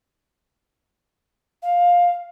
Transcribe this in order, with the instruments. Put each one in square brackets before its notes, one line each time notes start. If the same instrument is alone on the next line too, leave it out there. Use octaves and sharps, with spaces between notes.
[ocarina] F5